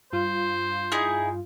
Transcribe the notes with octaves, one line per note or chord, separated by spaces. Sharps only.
G2 F4 C5
D#4 E4 G#4